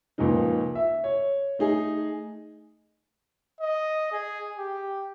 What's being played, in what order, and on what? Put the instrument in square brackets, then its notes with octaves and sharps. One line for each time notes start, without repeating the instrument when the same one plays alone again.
[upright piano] C#2 A#2 F3 D#4
E5
C#5
A3 D#4 G#4
[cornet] D#5
G#4
G4